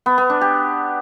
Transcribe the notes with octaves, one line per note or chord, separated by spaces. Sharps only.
B3
B3
D4
G4